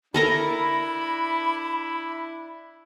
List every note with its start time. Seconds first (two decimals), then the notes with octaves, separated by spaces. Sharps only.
0.14 D4 E4 A4 A#4 A#5 B5